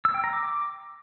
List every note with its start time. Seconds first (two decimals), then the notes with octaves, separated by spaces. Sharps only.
0.05 E6
0.14 G5
0.24 A#5
0.33 D6